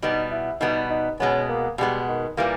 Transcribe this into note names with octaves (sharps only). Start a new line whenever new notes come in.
B2 G3 B3 D#4
E4
B2 G3 B3 D#4
D#4
B2 G#3 B3 C#4
A#3
B2 G3 G#3 B3
D#3
A#2 E3 G3 A#3